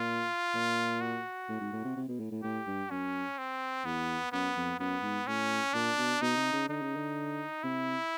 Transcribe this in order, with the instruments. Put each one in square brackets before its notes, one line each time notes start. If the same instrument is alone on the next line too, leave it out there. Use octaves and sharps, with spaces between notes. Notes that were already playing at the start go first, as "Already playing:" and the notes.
Already playing: [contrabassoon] A#2 [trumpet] F4
[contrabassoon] A#2
[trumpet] F#4
[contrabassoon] A2
G#2
A2
C3
C3
B2
A2
A2
[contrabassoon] A2 [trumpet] G4
[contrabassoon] G2
[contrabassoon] F#2 [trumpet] C#4
[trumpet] C4
[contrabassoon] E2 [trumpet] B3
[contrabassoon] F#2 [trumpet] B3
[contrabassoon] F2
[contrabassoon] F#2 [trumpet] B3
[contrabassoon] G#2
[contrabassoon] A2 [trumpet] C#4
[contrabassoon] A#2 [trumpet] D4
[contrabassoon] B2
[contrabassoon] B2 [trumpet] D#4
[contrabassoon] C3
C#3
[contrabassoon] D3 [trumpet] D#4
[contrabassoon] C#3
D3
[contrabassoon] C3 [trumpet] E4